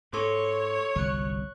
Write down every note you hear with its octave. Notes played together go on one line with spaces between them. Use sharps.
G#2 A4 C#5 C6 D6
G1 C2 F#3 C#6 F#6